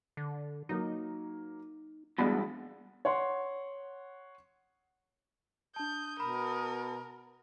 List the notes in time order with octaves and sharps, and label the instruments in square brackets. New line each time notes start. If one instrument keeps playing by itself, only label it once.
[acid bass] D3
[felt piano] F#3 A#3 [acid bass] D#4
[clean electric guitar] E2 G2 B2 [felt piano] G#3 D5 B5 [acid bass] B3
[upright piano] C#5 F#5 C6
[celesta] D4 A5 [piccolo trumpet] D#6 [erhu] G6
[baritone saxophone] B2 [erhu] A#4 [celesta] B5